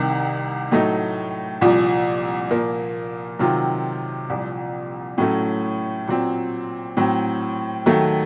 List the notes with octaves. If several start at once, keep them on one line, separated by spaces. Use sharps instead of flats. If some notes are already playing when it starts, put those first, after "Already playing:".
Already playing: C2 C3 D#3
A2 F#3 A3 D#4
C2 A#2 F3
A#2 F3 A#3
C3 D#3 F#3 C4 F4
C2 A#2 F3
A2 F#3 A3 C#4
A#2 F#3 C4
A2 F#3 C4
D#2 D#3 F#3 A3